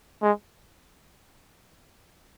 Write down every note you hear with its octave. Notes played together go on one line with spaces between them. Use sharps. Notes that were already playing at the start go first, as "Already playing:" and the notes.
G#3